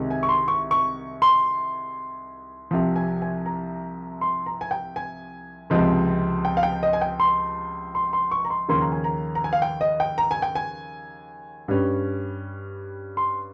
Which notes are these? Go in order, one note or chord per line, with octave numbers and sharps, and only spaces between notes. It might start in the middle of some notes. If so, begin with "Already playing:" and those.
Already playing: C2 C3 D#3 G#3 C4
G#5
C#6
C6
C#6
C#6
C6
C2 C3 F3
G#5
G#5
A#5
C6
A#5
G#5
G5
G#5
C#2 C3 F3 G#3 C4
G5
F5
G5
D#5
G#5
G5
C6
C6
C6
C#6
A#5
C6
D#2 C#3 F3 A#3 C#4 C6
A#5
G#5
A#5
A#5
G#5
F5
G5
D#5
G5
A#5
G#5
G5
G#5
G2 G3 C#4
C6